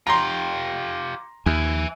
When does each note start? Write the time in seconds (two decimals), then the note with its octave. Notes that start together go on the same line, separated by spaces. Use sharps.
0.07 F4 G4 A#5 C6
1.46 D#2 E5 G#5